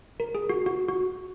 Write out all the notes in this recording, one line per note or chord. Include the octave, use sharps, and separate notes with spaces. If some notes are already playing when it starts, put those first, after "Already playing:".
A#4
G#4
F#4
F#4
F#4